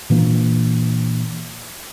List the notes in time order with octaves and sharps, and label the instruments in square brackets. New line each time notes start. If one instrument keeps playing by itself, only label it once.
[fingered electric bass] A#2 E3 A#3 D4